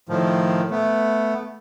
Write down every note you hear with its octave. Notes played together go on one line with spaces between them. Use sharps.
A2 D#3 F3
A3 B3